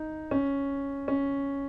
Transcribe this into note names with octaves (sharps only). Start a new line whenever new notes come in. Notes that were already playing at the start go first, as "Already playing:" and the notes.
Already playing: D#4
C#4
C#4